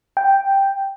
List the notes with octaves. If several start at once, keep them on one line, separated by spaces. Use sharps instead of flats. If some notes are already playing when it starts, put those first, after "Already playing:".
G5